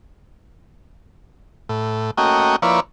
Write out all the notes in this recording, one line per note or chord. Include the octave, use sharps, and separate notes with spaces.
A2
A3 A#3 C#4 F#4 D#5 G5
F3 A#3 E4 B4 C#5 D5